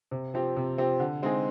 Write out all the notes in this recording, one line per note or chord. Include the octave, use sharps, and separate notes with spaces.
C3
F3 C4 G4
C3
F3 C4 G4
D3
G#3 C4 D#4 G#4